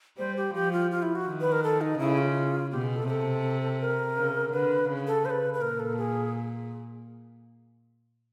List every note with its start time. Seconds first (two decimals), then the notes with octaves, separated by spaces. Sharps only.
0.18 G3 C5
0.36 G4
0.54 F3 G4
0.73 F4
0.91 F4
1.02 E4
1.15 F#4
1.27 D#3
1.41 B4
1.52 A#4
1.63 A4
1.81 D#4
1.99 C#3 E4
2.18 F4
2.72 B2 G4
2.84 G#4
2.96 A4
3.08 C3 A4
3.81 A#4
4.16 C#3
4.53 D3 B4
4.89 C#3
5.07 A4
5.25 C5
5.30 B4
5.53 B4
5.62 A#2 A#4
5.80 A4
5.98 G#4